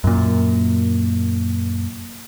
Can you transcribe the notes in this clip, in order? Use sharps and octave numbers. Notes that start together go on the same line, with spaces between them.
F#2 A#2